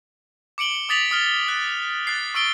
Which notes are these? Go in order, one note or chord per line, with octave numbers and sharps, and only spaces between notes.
D6 C#7 D7 F#7 G7
D6 D#6 A6 B6 F7 F#7
D#6 F6 G7
F#6
F#6 A6 C7
C#6 E6 D7 G7